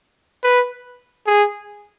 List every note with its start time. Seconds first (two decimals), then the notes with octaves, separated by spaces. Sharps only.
0.43 B4
1.27 G#4